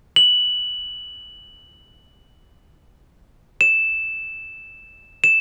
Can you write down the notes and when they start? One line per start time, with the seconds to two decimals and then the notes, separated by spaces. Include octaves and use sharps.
0.16 F#7
3.61 E7
5.24 E7